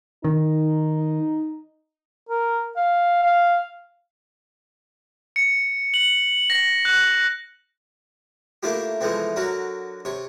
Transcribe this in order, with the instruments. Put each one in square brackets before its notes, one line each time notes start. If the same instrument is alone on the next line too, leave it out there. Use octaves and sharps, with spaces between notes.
[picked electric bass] D#3 [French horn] D#4
[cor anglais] A#4
F5
F5
[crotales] C#7
F#7
A#6
F#6
[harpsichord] A3 A#3 D4 E4 F4 G4
E3 F3 G#3 A3 B3 C4
D3 F#3 F#4 A#4
C3 C#5